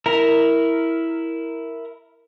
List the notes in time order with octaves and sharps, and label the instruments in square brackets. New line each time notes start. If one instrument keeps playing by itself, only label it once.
[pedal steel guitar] E4 A#4 A#5